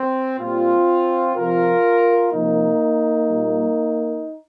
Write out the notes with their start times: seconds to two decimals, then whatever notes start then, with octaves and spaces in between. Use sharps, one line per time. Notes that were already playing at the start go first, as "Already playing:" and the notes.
Already playing: C4
0.39 A#2 G3 C4 F4
1.36 C3 F3 F4 A#4
2.32 C3 F3 A#3 D#4
3.29 A#2 G3